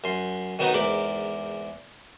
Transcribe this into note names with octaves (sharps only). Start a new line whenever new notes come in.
F#2 C6
D#3 F#3 B3 D#4 F#4 B4
E2 G#2 A#4 B5 D6